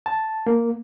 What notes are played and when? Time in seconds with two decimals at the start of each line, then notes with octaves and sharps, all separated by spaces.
0.06 A5
0.46 A#3